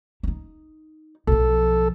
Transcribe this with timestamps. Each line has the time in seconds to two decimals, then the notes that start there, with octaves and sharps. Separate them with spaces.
0.23 D#4 E4
1.27 B1 F3 A4